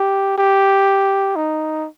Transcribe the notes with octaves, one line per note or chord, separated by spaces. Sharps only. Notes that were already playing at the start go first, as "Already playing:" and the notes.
Already playing: G4
G4
D#4